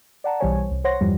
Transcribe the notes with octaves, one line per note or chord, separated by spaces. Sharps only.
D5 F#5 A5 A#5
B1 E3 G3 C5 C#5 G#5
C2
C5 C#5 F#5 C6 A#6
E2 G2 E3 F3 G3